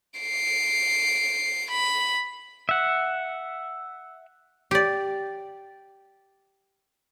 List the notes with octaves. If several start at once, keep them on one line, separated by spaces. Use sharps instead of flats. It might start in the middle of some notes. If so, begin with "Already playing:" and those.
C7 D7
B5
E5 F#5
G4 D5